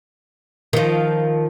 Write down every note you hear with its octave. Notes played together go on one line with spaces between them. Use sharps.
D#3 F3